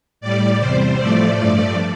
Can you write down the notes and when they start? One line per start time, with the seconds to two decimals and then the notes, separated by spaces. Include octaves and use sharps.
0.21 A2 G3 D5
0.59 E2 C3 G3 C5
0.98 A2 F3 A3 D5
1.36 G2 F3 A3 D5